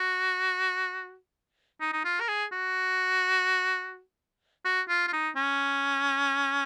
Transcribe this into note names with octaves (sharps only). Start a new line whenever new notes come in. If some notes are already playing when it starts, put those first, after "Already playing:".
Already playing: F#4
D#4
D#4
F4
A#4
G#4
F#4
F#4
F4
F4
D#4
C#4